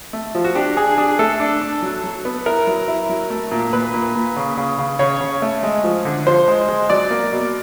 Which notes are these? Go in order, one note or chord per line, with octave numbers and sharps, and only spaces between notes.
A3
F3
F#4
D4 G4
D4 G#4
D4 G#4
A3 A4
D4
D4
F#3
F#3
B3
E4 A#4
F#3
E4
F#3
A3
A#2
A#2 B4
A#2
A#2
C#3
C#3
C#3
C#3 C#5
C#3
A3
G#3
F3
D3
F3 C5
G#3
G#3
F#3 D5
A#3
B2